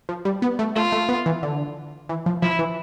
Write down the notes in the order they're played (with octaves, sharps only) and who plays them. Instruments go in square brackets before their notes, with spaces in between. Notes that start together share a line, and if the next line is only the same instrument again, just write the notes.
[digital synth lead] F3
G3
B3
A3
[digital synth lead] A3 [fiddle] F4
[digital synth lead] A3
B3
E3
D3
E3
F3
[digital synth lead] F3 [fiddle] E4
[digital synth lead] E3